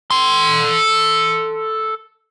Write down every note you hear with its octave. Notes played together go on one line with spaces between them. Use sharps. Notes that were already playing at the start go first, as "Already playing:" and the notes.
A4 C6